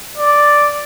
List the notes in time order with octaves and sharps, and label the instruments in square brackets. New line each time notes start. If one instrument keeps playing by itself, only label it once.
[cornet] D5